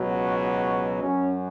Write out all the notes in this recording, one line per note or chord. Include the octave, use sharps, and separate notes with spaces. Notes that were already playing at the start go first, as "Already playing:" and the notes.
Already playing: C#2 B2 F#3
F#4
F#4
F#2 F#3 C#4